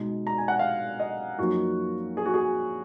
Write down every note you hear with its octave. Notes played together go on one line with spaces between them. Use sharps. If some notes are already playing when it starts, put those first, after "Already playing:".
Already playing: B2 G#3 D#4
A#5
G#5
F#5
F5
D#5
F#2 F3 A#3 D#4 F#4
G#4
F#4
G#4